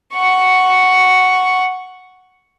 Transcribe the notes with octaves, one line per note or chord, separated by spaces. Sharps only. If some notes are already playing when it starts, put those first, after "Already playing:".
F#5 C#6